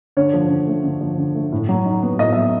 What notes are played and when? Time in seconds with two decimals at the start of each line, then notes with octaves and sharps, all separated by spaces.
0.17 D3 C#5
0.34 F3
0.50 D3
0.67 A3
0.84 D3
1.01 F3
1.18 D3
1.35 A3
1.52 A2
1.69 F#3
1.86 D#4
2.03 B3
2.19 A2 D#5
2.33 F#3 E5